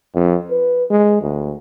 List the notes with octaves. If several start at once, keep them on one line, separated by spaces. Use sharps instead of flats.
F2
B4
G#3
D2